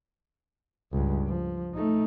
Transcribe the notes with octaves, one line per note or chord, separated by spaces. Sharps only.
C#2 G2
F3
A3 D#4